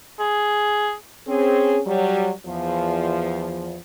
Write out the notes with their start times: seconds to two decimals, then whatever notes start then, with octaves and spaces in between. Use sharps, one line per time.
0.19 G#4
1.28 C4 C#4 G#4
1.86 F#3 G3
2.46 E2 F3